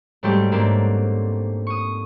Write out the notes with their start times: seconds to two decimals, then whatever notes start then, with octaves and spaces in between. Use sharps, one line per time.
0.23 G#2 F#3 G3 A3 C4 G4
0.52 G#2 A3 A#3 C4 D4
1.67 C#6 D#6